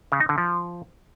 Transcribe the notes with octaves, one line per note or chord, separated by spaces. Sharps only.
C#3
D#4
D3
F3